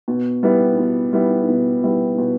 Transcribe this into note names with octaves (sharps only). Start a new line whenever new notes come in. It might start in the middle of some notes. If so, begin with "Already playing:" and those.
B2
G3 B3 E4
B2
G3 B3 E4
B2
G3 B3 E4
B2